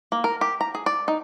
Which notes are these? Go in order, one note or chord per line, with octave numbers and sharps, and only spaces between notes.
A#3
A#4
G4
A#5
G#4
D5
D#4